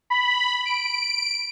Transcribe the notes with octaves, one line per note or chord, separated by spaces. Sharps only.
B5
D7